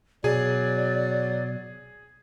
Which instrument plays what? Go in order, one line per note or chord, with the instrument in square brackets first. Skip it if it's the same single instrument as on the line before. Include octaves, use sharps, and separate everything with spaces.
[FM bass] B2 [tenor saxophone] F#3 [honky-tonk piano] G#4 [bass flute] D5